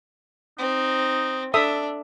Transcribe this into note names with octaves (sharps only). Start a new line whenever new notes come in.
C4 D#4
D4 A4 E5 D#6